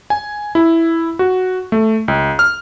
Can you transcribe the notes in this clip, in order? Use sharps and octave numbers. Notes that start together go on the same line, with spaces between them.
G#5
E4
F#4
A3
C#2
F6